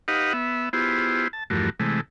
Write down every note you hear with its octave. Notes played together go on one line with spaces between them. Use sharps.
D#4 G4 B4 D#5 F5 F#5
B3 E5
B3 E4 F4 G4 G#4 C5
A5
E2 G2 F3 A3 F#4 A#4
C3 E3 G#3 A3